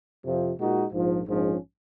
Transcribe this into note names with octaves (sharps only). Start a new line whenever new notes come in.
F2 C3 F3
A#2 G#3 D#4 F#4
A#1 G#2 F3
A#1 G#2 F3 G#3 C#4